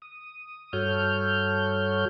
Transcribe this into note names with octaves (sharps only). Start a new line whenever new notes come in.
D#6
G2 F#4 A4 C#5 F6 G6